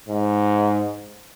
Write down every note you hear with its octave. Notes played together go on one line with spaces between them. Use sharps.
G#2